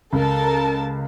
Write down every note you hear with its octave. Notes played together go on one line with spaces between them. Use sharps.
C#2 A4 A#4 A5